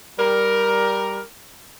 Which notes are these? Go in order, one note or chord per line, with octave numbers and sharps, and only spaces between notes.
G3 A#4